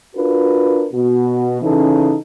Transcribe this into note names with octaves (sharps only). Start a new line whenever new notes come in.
D4 F4 F#4 A#4 B4
B2 F#4
C#3 E3 C#4 D#4 A4